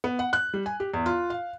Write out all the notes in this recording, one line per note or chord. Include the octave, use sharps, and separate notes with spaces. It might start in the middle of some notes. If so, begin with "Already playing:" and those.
B3
F#5
F#6
G3
G#5
G4
E2
F4
F5